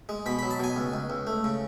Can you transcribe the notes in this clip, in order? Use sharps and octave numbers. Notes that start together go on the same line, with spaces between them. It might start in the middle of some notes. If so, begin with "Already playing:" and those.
G#3
B2 B5
F#3 B5
A5
B2 G#5
C#2
C#2
C#2
A3
C#3